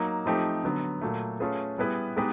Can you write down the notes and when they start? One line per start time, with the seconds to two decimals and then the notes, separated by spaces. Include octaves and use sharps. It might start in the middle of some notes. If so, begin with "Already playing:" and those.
Already playing: F#3 A#3 D#4
0.26 F3 A3 C4 D#4 G4
0.63 D3 F#3 B3
1.01 A#2 F#3 A3
1.40 A3 C#4 F4 G#4 B4
1.78 G3 B3 E4 G#4 B4
2.17 G#3 B3 D#4 G4 B4